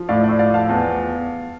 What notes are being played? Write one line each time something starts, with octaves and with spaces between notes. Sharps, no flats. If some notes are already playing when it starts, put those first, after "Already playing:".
Already playing: F3
A2 D5 F5
D5
A2
D5 F5
F3 F5 A5
E2